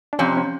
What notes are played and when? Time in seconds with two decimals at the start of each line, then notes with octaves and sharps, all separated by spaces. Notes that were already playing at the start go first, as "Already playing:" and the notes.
0.13 D4
0.19 F2 C3 C#4
0.37 C#4